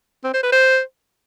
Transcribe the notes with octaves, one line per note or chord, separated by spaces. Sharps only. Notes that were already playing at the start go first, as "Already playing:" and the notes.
C4
C5
B4
C5